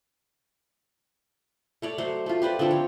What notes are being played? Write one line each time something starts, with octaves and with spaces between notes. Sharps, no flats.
A3 C#5 D5
F#3 A3 C5
A3 F4
G4 B4 C5 D5
D3 F3 C4 A4
C#5